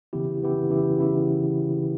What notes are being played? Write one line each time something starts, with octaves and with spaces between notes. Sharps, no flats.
C#3 E3 B3 E4 G4
C#3 E3 B3 E4 G4
C#3 E3 B3 E4 G4
C#3 E3 B3 E4 G4